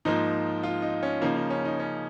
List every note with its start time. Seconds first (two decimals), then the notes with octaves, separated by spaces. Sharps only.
0.05 G#2 F3 A#3 D#4
0.63 F4
0.82 D#4
1.03 C#4
1.21 C#3 F3 A#3 D#4
1.37 D#4
1.50 C#4
1.65 D#4
1.80 C#4